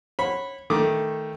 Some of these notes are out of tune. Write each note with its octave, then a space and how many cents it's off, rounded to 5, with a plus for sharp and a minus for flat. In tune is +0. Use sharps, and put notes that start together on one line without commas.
C#5 -25 F#5 +0 B5 +0
D#3 +10 A3 +0 D6 +10